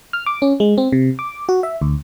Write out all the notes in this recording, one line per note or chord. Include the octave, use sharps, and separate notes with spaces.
F6
D6
C#4
G#3
C4
C3
D6
F#4
E5
D2